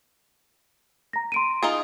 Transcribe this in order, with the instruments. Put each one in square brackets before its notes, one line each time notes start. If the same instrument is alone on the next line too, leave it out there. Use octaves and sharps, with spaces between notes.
[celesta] A#5 A#6
C6 D7 D#7
[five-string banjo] D#4 F4 G#4